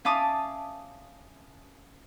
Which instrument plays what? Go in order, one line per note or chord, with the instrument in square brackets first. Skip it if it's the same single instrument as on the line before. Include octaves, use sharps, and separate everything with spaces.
[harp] C#4 E5 F5 A5 D6 D#6